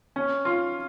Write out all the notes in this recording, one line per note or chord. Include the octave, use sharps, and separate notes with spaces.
C#4
F4